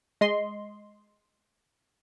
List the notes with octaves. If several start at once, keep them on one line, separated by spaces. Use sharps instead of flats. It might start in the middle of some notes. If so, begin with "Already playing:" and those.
G#3 D#5 C6